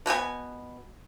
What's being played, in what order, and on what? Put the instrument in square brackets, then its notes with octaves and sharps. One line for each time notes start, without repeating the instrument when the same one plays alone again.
[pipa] B2 B3 C4 G#5